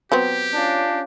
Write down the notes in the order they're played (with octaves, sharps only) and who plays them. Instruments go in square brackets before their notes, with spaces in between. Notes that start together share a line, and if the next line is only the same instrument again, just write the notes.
[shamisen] F#3 B3 C4 [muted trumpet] G4
[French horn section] C#4 F4 [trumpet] D4